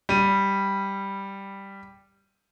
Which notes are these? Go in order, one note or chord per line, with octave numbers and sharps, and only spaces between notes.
G3 D#7